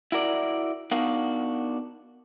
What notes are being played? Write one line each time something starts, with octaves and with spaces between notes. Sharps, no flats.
E4 F#4 A#4 D5
B3 D4 D#4 F#4 A#4 F5